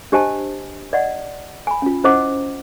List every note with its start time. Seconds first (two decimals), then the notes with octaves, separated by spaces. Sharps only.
0.12 D4 G4 C5 D#5 G#5 A5
0.93 D5 D#5 F#5
1.67 G#5 B5
1.82 C#4 F4
2.04 C#4 E4 C5 D#5 F#5 D6